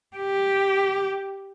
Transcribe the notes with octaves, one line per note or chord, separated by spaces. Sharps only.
G4